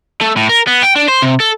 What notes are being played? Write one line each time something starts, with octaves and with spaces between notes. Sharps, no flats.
A3
A2
A#4
B3
G5
D4
C5
C3
A4